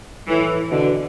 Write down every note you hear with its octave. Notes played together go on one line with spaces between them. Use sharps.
A2 E3
B2 D3